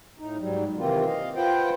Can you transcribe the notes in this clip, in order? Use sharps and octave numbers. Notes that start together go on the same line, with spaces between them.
A2 D#4
G#2 F#3 G3
C3 D#3 E3 A#3 C4 F4
D#5 F5
F4 B4 C5 F#5 G5